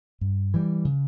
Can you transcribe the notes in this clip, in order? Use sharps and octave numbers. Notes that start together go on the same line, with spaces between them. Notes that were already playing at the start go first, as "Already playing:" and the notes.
G2
E3 G3
C#3